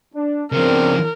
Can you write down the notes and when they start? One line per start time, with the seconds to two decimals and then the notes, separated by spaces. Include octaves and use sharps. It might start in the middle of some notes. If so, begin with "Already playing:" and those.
0.15 D4
0.52 C#3 F3 B3 C4 D4 A#4